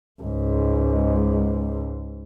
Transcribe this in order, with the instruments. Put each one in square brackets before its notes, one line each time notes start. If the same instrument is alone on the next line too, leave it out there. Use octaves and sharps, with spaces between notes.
[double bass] C#2 G#2